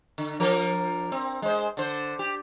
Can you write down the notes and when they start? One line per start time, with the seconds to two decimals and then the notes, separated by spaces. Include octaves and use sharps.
0.18 D3
0.40 F3 D4 A#4
1.12 C4
1.42 G#3 C5
1.77 D3 C5
2.19 G4